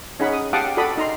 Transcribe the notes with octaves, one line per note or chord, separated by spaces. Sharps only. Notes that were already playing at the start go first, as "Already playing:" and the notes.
C#4 D#4 G#4 F#5 B5
D#6
G4 F5 F#5 A5 D6 D#6
F#4 A4 D5 B5 D#6
D#4 A#5 C6